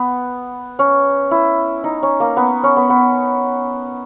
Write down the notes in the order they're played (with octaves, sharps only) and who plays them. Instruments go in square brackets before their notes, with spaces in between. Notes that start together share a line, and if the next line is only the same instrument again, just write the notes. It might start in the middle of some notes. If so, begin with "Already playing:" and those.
Already playing: [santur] B3
C#4
E4
D#4
C#4
A#3
B3
C#4
B3
B3